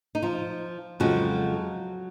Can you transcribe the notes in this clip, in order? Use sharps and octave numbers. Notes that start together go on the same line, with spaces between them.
D#4
F3 F4
F2 C#3 F3 F#3 G#3 F#4